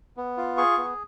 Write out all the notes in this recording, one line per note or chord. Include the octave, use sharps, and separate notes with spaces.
B3
F4
G#4 C#6
B3